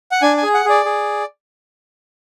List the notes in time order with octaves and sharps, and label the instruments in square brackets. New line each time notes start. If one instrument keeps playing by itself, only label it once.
[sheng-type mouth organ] F#5
D4 G#5
G#5
G#4
F#5
G#4 D5
G#4